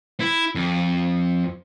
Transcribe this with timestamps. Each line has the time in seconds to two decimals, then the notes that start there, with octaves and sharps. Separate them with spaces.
0.20 E4
0.55 F2